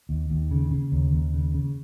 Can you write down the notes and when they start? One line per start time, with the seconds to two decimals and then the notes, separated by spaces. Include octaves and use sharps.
0.09 D#2
0.30 D#2
0.51 C#3
0.71 C#3
0.92 D#2
1.13 D#2
1.34 C#3
1.54 C#3